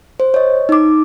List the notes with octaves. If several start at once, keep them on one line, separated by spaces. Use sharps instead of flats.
C5
C#5 D#5
D#4 D6